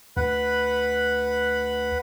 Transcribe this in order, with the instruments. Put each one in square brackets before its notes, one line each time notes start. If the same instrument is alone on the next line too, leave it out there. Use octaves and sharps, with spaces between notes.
[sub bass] D2 [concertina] B4 F#5 B5